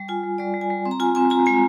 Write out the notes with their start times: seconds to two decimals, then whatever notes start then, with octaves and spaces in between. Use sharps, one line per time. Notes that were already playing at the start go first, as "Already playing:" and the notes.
Already playing: G3
0.08 F4 G#5
0.23 G3
0.38 G3 D5
0.54 G3
0.61 G#5
0.70 G3
0.86 C4
0.91 A#5
1.00 F4 G#5
1.15 C4 G#5
1.30 F4 A#5
1.46 G#3 G#5